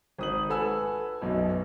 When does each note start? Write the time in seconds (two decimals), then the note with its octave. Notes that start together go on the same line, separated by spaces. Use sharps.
0.19 G#1 D#6 F#7
0.50 A4 B4 F#5 G#5 E6
1.22 B1 F#2 B2